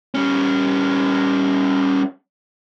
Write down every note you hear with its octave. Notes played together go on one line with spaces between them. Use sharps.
G3 C#4